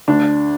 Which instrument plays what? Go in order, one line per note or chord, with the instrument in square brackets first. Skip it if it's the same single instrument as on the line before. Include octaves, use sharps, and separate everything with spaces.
[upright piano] D2 D4